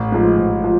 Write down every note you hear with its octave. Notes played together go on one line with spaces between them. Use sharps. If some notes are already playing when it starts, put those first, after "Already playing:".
Already playing: A1
G#2 F3
A1
F3